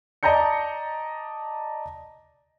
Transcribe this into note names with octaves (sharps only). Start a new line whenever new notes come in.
D5 D#5 A5 A#5 G6 C#7